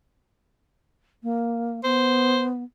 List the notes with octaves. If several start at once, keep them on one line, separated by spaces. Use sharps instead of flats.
A#3
B3 C5